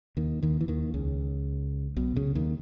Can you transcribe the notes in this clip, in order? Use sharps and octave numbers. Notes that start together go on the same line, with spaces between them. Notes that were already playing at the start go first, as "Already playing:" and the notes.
D#2 D#3
D#2 D#3
E3
D#2 D#3
C#2 C#3
B1 B2
C#2 C#3
D#2 D#3